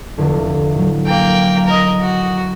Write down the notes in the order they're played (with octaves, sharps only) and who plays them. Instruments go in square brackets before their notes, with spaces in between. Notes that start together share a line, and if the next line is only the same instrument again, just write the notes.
[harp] F1 E2 D3
A2 F#3
[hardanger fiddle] A#3 G5
A#4 D#5
F#4